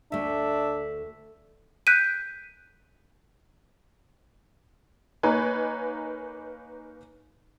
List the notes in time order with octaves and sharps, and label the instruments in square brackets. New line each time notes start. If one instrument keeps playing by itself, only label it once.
[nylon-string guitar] D2 A3 [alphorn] D4 [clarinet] E5
[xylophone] F#6 G6 B6 D7 D#7
[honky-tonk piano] A#3 D#4 B4 C#5 G#5